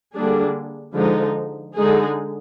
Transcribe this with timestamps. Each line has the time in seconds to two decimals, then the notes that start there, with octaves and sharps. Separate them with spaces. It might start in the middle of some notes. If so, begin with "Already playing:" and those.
0.15 D3 G3 A#3 D4 G#4
0.96 D3 F3 G#3 D#4
1.77 D3 G#3 D#4 G#4